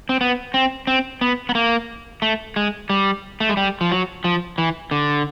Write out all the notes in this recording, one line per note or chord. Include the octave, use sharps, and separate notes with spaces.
C4
B3
C4
C4
B3
B3
A#3
A3
G#3
G3
A3
G#3
G3
F3
F#3
F3
E3
D3